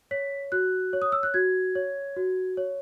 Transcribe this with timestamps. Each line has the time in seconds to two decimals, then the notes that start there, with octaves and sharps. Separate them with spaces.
0.11 C#5 B6
0.52 F#4 F#6
0.93 C#5
1.02 D#6
1.12 E6
1.23 F#6
1.34 F#4 G#6
1.75 C#5
2.17 F#4
2.57 C#5